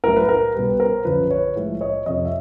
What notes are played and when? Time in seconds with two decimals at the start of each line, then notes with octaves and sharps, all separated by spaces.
0.04 A2 F#3 A#4
0.16 B4
0.29 A#4
0.54 B2 G3 B4
0.69 B4
0.80 A#4 C5
1.05 F#2 D3 F3 B4
1.31 B4 C#5
1.56 A2 F3 G#3
1.81 C#5 D#5
2.06 F2 C3 F3 C#5 D#5
2.25 E5